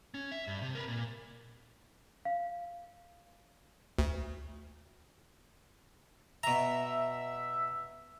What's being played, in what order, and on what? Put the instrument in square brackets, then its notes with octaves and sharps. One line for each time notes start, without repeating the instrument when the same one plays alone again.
[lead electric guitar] C#4
E5
G2
C3
A#4 B4
A#2
[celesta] F5
[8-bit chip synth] D2
[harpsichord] B2 A#5 [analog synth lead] E5